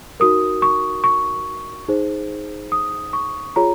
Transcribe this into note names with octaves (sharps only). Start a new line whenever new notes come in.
D#4 F#4 A#4 D#6
C#6
C#6
D#4 G#4 C5
D#6
C#6
F4 G#4 C#5 A#5